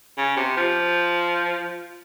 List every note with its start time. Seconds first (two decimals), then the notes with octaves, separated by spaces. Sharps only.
0.17 C#3
0.36 C3
0.57 F3